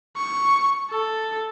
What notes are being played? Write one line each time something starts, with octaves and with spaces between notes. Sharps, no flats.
C#6
A4